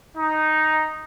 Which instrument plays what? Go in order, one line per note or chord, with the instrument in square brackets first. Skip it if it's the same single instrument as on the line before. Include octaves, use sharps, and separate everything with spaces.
[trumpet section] D#4